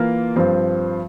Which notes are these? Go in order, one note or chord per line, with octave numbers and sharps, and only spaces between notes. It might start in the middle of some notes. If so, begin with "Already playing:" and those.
Already playing: E3 A#3 F4 A#4
G2 F3 C4